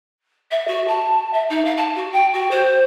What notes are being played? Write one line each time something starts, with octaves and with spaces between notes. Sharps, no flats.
E5
F#4
A5
E5
D#4
F5
A5
F#4
G5
F#4
C5